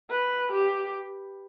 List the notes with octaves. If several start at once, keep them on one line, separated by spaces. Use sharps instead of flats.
B4
G4